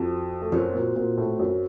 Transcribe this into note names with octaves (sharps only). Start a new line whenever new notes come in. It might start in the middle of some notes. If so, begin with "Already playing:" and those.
Already playing: F2 F3 F#4 A4 C5
A3
F#2 F#3 C4 F#4 C5
A#2 A#3
A#2 A#3
A2 A3
F#2 F#3